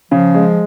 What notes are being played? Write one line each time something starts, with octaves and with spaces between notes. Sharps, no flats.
C#3 F3
G#3